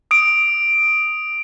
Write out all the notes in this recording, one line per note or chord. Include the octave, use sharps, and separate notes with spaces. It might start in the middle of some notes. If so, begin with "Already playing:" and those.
D#6 D7